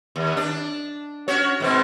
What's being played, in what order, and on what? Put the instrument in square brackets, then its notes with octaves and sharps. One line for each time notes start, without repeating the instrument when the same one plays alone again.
[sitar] D#2
D4
C#4 F#4 C#5
G#2 B2 C4